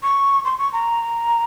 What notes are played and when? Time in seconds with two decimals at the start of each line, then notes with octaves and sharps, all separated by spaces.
0.03 C#6
0.45 C6
0.59 C#6
0.73 A#5